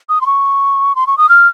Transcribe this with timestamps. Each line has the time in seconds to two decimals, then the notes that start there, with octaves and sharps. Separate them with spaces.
0.09 D#6
0.21 C6
0.26 C#6
0.96 C6
1.07 C#6
1.18 D#6
1.29 F6